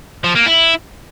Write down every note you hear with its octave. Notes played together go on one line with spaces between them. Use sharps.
F3
A#3
E4